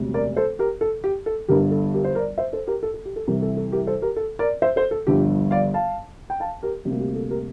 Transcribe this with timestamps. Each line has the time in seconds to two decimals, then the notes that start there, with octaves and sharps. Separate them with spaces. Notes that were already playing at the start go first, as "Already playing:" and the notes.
Already playing: E1 D2 C3 G3
0.14 A#4 D5
0.36 A4 C5
0.59 G4 A#4
0.81 A4
1.04 G4
1.26 A4
1.48 G1 G2 D3 G3 G4 A#4
1.71 A4
1.94 G4 A#4
2.04 C5
2.15 A#4 D5
2.38 C5 E5
2.53 A4 C5
2.67 G4 A#4
2.83 A4
2.94 A4
3.05 G4
3.16 A4
3.27 C2 C3 E3 G4 A#4
3.42 A4
3.57 A4
3.72 G4 A#4
3.87 A4 C5
4.02 G4 A#4
4.16 A4
4.39 A#4 D5
4.62 C5 E5
4.76 A4 C5
4.91 A4
5.07 G1 G2 D3 F3 G4
5.51 D5 F5
5.74 F5 A5
6.30 G5
6.40 F5 A5
6.63 G4 A#4
6.85 D2 C3 G3 A#3 G4
7.00 G4
7.15 A4
7.30 G4 A#4